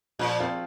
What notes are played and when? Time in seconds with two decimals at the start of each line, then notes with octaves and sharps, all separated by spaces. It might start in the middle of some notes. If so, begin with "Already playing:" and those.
0.19 A#2 F3
0.40 C4 F4